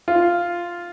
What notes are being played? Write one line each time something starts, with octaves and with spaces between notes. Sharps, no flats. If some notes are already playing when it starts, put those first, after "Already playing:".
F4